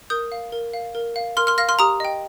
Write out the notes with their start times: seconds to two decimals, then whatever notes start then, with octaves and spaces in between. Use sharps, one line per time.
0.10 A#4 D#6 G6
0.32 F5
0.52 A#4
0.73 F5
0.95 A#4
1.16 F5
1.37 A#4 C6 F6
1.47 C6 F6
1.58 F5 F6 A#6
1.69 C6 F6
1.79 G4 A#5 D#6
2.00 D#5 G5